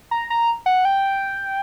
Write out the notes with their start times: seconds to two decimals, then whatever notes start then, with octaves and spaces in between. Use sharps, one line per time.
0.11 A#5
0.30 A#5
0.66 F#5
0.85 G5